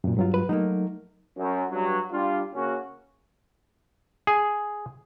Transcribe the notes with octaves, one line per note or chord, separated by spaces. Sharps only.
F#2 A#2
G2 F#3 F4
B4
F#3 A3 A#3 D#4
F#2
G2 F#3
G3 D4 F4
C#3 A#3 C#4 F#4
G#4